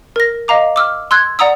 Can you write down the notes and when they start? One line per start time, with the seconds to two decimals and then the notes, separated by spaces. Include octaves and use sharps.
0.16 A#4 A#6
0.48 D#5 F5 A#5 D6
0.76 D6 E6 F6
1.11 C6 E6 F#6 G#6
1.39 D5 F#5 A#5 D#6 E6